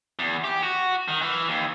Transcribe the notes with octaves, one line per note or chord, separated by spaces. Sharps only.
E2
G4
F#4
D#3
E3
D#2